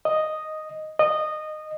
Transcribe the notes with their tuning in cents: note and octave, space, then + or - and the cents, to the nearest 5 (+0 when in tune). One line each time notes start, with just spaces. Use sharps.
D#5 +0
D#5 -15